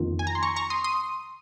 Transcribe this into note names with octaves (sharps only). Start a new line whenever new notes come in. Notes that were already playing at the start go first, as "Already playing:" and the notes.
Already playing: F2 D#3 A#3 F4
G#5
A#5
C6
A#5 C#6
A#5 C#6
C6 D#6
C6 D#6